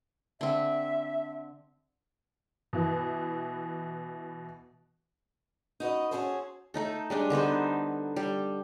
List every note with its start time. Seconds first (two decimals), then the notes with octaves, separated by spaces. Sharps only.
0.41 D3 C4 E5
2.73 B2 E3 B4
5.80 D#4 F#4 B4 D#5
6.11 C#4 D4 F#4 G#4 A4 C5
6.74 A3 D#4 A4
7.10 G3 G#3 D4
7.30 D3 B3 D#4 C5
8.16 G3